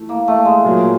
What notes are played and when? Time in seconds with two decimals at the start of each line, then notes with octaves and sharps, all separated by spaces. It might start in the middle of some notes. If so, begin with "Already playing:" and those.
Already playing: E3 A3
0.09 A#3
0.28 A3
0.45 G#3
0.64 A#2 F#3 A#3